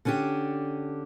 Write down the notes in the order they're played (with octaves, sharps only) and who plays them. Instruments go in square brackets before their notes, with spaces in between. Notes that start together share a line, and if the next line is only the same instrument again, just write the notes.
[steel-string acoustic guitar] D3 C#4 D4 F#4 G4